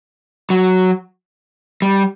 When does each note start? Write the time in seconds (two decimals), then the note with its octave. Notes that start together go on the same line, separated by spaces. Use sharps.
0.50 F#3
1.82 G3